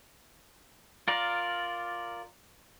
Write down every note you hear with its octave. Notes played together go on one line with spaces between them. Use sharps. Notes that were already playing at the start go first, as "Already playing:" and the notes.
F4 A#4 D5